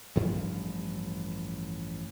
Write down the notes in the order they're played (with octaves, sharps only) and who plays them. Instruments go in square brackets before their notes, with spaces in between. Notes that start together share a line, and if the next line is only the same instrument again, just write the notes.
[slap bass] A1 G2 F3